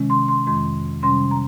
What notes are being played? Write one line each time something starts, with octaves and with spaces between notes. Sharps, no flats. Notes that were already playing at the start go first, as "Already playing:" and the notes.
Already playing: C3 D#3 G#3 C#4
C6
C6
F2 D#3 G#3 C6
C3 G3 C#4 C6
A#5